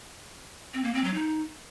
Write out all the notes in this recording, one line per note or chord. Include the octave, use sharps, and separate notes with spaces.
C4
A#3
C4
F#3
D#4